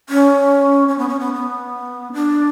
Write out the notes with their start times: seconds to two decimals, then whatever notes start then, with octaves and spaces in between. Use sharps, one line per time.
0.09 C#4
0.88 C#4
0.98 B3
1.09 C#4
1.20 B3
1.34 B3
2.13 D4